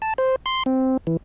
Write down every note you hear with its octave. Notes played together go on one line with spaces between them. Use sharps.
A5
C5
C6
C4
E3